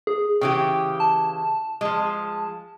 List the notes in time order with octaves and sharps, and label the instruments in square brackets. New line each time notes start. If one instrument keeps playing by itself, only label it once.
[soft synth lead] G#4
[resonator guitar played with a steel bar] C#3 E3 G4 [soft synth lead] G5
[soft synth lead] A5
[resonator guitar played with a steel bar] F3 G#3